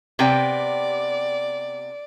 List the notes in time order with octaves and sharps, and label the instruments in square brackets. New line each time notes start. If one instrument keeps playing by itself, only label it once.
[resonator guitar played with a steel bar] C3 B3 G5 [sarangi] D5